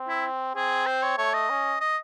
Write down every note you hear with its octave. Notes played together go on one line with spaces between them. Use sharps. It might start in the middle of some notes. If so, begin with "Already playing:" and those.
Already playing: C4
E4
C4 G#4
C5
C#5
A3 C#5
D#5
C#4
D#5